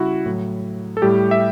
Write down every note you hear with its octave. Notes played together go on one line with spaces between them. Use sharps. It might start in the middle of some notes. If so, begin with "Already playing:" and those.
Already playing: C#3 G3 E4 F#4
A2 F#3
A4
A2 G3 G4
E5